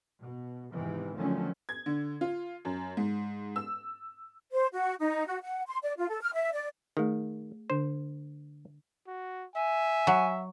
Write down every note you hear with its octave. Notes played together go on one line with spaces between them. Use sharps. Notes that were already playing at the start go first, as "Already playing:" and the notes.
B2
E2 G#2 C3 D#3 E3
D3 D#3 F3 F#3 A3 C#4
G#6
D3
F4
F#2
G#2
E6
C5
F#4
D#4
F#4
F#5
C6
D5
F4
A4
F6
E5
D5
D#3 A3 G#4
D3 D4 C5
F#4
E5 G#5
F#3